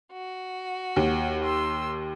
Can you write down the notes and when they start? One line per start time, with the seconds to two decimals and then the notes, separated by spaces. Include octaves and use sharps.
0.13 F#4
0.96 D#2
1.44 C6 E6